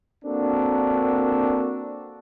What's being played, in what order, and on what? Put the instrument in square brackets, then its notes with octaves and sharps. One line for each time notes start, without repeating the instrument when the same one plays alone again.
[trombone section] A#3 C4 D4 F#4 A4 A#4